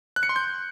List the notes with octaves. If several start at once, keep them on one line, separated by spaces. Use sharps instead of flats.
F#6
C#7
C6
G6